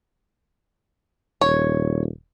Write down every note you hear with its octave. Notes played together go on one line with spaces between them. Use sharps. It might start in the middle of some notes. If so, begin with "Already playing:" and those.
D#1 C#5